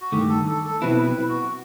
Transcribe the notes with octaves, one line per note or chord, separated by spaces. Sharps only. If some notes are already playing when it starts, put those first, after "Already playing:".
F#4
G2 D#3 A3 G4
A4
A4
A4
B1 B2 F#3 C4 E4 B4
B4
F#4